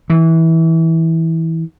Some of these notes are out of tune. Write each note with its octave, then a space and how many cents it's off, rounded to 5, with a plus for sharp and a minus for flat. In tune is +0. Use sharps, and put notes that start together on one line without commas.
E3 -20